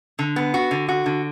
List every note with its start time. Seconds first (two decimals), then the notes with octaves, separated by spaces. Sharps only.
0.19 D3
0.36 B3
0.54 F#4
0.71 D3
0.89 F#4
1.06 D3